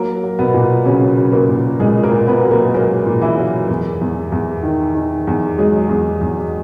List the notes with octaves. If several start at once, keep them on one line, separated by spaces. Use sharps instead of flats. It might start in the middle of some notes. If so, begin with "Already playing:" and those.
Already playing: F#3 A#3 A#4
F#3
B2 B3
A#2
C#3 F#3 C#4
F#3
A#3 A#4
A#2
A#2 G#3 G#4
A#3 A#4
A#2
B3 B4
F#3
A#3 A#4
F#3 A#3 A#4
A#2
E3 E4
F#3
E2
E2
E2
D#3
D#3
E2
F#3 G#3 G#4
E2
E2